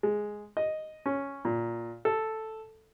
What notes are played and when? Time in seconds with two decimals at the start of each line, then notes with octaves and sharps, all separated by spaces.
0.03 G#3
0.57 D#5
1.06 C#4
1.45 A#2
2.05 A4